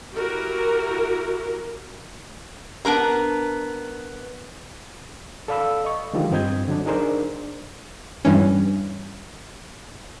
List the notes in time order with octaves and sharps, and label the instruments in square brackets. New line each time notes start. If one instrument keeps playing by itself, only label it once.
[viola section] E4 F#4 G4 A#4
[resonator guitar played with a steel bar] B3 D4 A#4 A#5
[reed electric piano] A4 D5 F5 B5 E6
D#5 C#6
D3 D#3 F3 G#3 F4 G4
G2 C4 D#5 G6 G#6
D3 F#3 D4
D4 D#4 G#4 A#4 C5 D5
[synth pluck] G2 E3 C#4